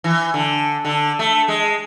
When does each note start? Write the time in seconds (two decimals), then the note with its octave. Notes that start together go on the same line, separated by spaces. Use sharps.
0.04 E3
0.34 D3
0.85 D3
1.19 A3
1.48 G#3